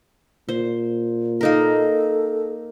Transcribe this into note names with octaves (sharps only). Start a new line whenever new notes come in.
A#2 C5
A#3 D#4 A4 A#4